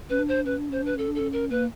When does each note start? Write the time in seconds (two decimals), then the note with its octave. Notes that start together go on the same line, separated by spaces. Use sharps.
0.10 C#4 B4
0.19 D4
0.28 C5
0.45 C#4 B4
0.58 D4
0.69 C#4 C5
0.83 D4 B4
0.95 C#4 A4
1.08 D4
1.15 C#4 A4
1.33 A#4
1.51 A#3 B4